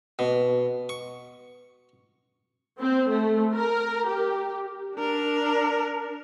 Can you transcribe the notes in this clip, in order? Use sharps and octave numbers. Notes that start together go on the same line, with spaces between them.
B2
C#6
C4
A3
A#4
G4
D4 A#4